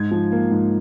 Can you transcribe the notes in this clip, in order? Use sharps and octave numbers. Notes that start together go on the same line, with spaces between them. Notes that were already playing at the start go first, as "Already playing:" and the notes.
Already playing: G#2 G#6
F3
A#3
G#2